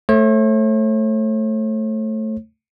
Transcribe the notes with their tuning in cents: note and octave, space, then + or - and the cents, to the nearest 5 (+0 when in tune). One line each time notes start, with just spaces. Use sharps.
A3 +0 C#5 -45